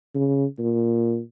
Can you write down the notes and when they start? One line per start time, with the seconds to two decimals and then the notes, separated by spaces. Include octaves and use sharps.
0.15 C#3
0.59 A#2